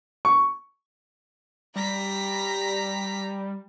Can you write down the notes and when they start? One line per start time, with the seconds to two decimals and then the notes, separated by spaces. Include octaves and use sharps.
0.25 C#6
1.76 G3 A#5 B6